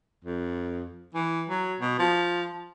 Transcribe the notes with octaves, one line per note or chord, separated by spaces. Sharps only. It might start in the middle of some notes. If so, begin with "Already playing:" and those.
F2
E3
F#3
B2
F3